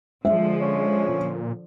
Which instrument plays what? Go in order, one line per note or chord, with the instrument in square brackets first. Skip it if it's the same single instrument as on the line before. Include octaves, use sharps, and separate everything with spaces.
[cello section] D3 F3 [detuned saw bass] G#3 [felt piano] E5
[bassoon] C#4
[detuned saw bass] A#2